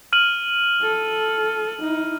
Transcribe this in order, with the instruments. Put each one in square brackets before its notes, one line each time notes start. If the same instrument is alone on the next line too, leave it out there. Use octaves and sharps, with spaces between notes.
[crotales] F6 D#7 F#7
[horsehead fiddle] A4
D#4 E4